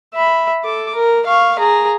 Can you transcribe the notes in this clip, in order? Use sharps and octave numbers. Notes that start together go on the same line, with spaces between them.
E5 B5
A4 D6
A#4
F5 C#6
G#4 A#5